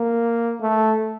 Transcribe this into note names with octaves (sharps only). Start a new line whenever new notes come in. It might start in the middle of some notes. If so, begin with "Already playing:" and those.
Already playing: A#3
A3